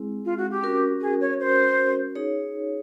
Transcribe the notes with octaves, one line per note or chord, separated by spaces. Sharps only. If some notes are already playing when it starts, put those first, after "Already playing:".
Already playing: G#3 C4 E4 G#4
F4
F#4
G4
C#4 F#4 A#4
G#4
C#5
C5
D#4 G#4 C#5